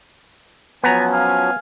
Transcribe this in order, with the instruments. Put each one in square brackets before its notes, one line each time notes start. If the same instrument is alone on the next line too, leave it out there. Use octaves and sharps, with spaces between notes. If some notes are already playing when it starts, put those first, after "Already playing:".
[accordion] F3 F#3 C#4 [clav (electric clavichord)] B3 A#5 [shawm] G#5
[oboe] F5 [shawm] G#5